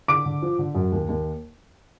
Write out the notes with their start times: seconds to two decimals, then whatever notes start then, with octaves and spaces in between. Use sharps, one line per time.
0.08 D3 D6 D7
0.26 D3
0.42 F3
0.59 D3
0.75 F#2
0.92 D#2
1.09 D#2